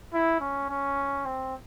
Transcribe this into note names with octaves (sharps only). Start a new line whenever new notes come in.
E4
C#4
C#4
C4